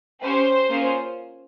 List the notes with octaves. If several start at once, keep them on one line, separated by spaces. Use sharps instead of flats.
C#4 G4 C5
A#3 C#4 F4 G#4